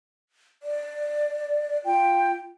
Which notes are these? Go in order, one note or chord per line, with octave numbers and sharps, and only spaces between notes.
D5
F4 G5